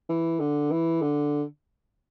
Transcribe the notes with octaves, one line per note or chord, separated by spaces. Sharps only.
E3
D3
E3
D3